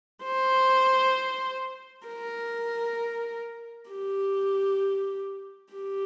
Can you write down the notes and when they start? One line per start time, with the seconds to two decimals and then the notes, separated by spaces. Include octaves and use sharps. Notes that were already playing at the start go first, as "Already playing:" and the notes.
0.24 C5
2.07 A#4
3.91 G4
5.74 G4